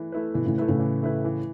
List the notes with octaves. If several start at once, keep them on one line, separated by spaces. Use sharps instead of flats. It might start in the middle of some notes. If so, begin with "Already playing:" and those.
Already playing: E3 A3 E4 B4
A3 E4 B4
B2 E3
A2 C#3
A3 E4 B4
A2 C#3
E3
A3 E4 B4
E3